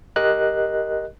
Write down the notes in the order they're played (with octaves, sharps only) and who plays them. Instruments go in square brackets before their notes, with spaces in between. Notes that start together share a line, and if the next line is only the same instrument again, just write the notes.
[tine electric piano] G4 A#4 D#5 F#6